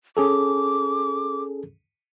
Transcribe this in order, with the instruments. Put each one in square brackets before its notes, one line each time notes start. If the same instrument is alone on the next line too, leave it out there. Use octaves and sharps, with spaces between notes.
[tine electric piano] C#4 G#4 A4 [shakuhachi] D6